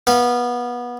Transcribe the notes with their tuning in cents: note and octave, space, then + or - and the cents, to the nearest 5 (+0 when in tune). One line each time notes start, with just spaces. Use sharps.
B3 -20 F5 -10